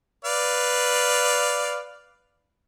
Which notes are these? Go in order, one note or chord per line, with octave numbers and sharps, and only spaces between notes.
B4 D5 F5